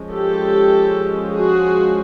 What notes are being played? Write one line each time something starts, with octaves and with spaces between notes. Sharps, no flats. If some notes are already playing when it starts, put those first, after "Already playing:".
Already playing: F3 G#3 C#4
G4 A4
F#4 G#4